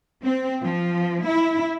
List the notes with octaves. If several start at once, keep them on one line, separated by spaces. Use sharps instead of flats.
C4
F3
E4